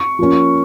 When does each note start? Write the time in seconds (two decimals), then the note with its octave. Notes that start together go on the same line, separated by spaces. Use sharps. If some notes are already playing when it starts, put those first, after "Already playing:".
Already playing: C#6
0.19 F3 A#3 C#4